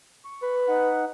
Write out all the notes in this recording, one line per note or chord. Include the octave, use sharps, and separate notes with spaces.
C#6
B4
D#4 F#5